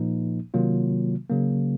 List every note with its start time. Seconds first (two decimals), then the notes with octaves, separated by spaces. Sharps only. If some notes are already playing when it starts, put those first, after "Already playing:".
Already playing: A#2 F3 A#3 D#4
0.54 C3 D#3 F#3 A#3 F4
1.30 C#3 F#3 A#3